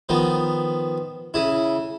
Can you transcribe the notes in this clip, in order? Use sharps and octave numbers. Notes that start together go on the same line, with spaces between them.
D#3 F3 B3
C#3 E4